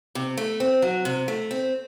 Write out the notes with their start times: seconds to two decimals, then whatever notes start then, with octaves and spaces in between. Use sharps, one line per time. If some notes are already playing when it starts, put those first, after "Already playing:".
0.15 C3
0.37 A3
0.60 C4
0.82 F#3
1.05 C3
1.28 A3
1.51 C4